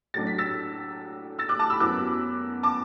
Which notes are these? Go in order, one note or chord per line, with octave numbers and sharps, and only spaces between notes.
A2 F#3 D4 A6
B6
E6 A6
E6 A6
D6 F#6
A5 D6
B5 E6
F#2 F#3 B3 E4 D6 F#6
A5 D6